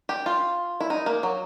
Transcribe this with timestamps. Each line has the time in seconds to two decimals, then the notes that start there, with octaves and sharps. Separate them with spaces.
0.09 G4
0.26 F4
0.80 E4
0.90 D#4
1.06 A#3
1.23 F#3